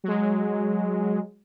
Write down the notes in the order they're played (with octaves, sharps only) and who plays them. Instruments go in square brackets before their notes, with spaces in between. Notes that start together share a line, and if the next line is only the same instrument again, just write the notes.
[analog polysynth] F#3 G#3